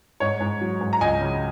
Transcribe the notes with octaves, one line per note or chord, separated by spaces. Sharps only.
G#2 C#5
G#2
F#3
G#2
A#5
C#2 D#5 G#5
C#3